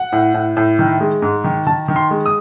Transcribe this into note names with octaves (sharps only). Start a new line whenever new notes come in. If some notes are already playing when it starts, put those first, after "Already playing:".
Already playing: F#5
A2
A2
A2
D#3
G#3
G#2
D#3
D#3 A5
D#3
C6
G#3
D#6